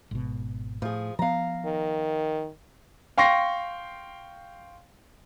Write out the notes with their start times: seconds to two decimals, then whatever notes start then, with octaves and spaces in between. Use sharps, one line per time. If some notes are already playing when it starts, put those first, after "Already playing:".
0.11 G#1 B2
0.82 A2 F3 G#4
1.19 F3 B3 F5 A#5
1.65 D#3
3.18 F5 G5 C6 C#6 A#6 C7